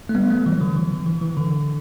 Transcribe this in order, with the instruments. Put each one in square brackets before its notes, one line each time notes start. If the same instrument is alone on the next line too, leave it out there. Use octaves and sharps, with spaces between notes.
[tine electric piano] A3
G3 B3
F#3 A3
E3 G3
D3 F#3
E3
D3
E3
E3
D3